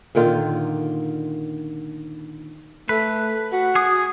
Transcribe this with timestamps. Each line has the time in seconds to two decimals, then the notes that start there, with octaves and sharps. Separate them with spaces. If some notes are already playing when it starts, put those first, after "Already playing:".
0.15 A#2 D3 D#3 F4
2.89 A3 B4
3.53 F#4
3.75 G#4 D#6